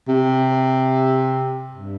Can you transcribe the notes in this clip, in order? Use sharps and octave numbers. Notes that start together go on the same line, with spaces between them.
C3
G2